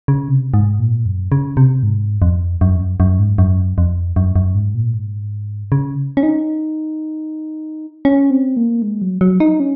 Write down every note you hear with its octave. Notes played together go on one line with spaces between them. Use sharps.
C#3
C3
G#2
A#2
F#2
C#3
C3
G#2
F2
F#2
F2
F#2
F#2
G#2
F#2
F2
F#2
F#2
G#2
A#2
G#2
C#3
C#4
D#4
C#4
C4
A#3
G#3
F#3
F#3
D#4
C#4